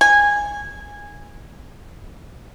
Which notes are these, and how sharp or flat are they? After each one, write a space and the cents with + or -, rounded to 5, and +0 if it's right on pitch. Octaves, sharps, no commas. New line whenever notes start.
G#5 -15